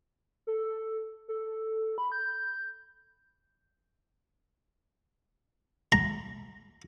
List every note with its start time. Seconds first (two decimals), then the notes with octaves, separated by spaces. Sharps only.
0.47 A4
1.28 A4
1.98 B5
2.12 G6
5.92 A#5